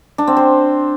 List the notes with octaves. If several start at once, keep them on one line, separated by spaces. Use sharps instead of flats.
D4
C4
C5